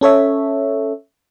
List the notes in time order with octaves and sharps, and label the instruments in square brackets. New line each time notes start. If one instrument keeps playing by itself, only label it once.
[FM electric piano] C#4 A4 C#5 E5